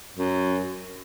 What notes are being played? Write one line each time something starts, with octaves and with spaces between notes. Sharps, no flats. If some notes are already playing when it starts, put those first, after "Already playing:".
F#2